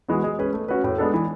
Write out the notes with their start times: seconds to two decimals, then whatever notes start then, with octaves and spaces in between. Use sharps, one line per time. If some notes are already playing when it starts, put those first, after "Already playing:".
0.08 E3 G#3 B3 F#4
0.24 G#3
0.39 C#4 G#4 B4
0.53 A3
0.68 C#4 F#4 B4
0.84 A2
0.98 G#3 B3 D4 A4
1.14 E3